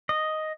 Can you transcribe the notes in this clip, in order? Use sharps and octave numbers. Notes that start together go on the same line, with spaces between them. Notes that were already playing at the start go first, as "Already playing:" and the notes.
D#5